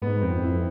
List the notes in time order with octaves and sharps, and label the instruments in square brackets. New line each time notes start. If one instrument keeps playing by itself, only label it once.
[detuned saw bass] G#2 [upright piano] B3
[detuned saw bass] F2 [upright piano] C4
[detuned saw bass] F2 [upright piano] E4